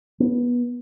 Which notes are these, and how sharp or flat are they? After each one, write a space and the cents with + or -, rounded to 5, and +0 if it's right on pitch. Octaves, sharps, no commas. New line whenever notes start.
B3 -20